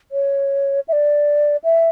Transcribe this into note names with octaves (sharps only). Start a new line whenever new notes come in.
C#5
E5
D5
E5